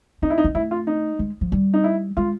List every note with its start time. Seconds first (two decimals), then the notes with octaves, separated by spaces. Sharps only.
0.22 C4 D#4
0.30 E4
0.38 D#4
0.44 C4
0.55 A3 E4
0.71 F4
0.87 D#4
1.19 G#3
1.41 F3
1.52 G3
1.74 D#4
1.84 E4
2.17 G#3 F4